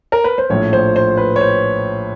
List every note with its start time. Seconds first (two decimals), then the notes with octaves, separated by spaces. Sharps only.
0.12 A#4
0.24 B4
0.38 C5
0.50 A#1 A2 F3 C#5
0.73 C5
0.96 C5
1.17 B4
1.36 C#5
1.41 C5